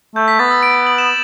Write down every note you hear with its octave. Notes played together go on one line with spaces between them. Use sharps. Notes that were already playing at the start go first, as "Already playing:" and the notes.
A3 G6
B6
B3 A6
E6
D7
D7
F#7
E7